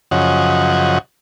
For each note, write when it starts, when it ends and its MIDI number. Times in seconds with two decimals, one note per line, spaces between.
0.11 0.98 42
0.11 0.98 49
0.11 0.98 53
0.11 0.98 75
0.11 0.98 78